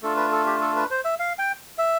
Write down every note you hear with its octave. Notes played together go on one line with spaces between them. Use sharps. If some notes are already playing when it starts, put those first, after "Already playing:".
A3 D4 F4 A4
B4
A4
G4
A4
B4
C5
E5
F5
G5
E5